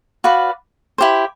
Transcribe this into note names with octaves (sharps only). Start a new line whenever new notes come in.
F#4 B4 D5 F5
E4 G4 C5